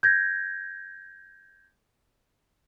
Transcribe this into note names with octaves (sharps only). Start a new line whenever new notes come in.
G6 G#6 A#6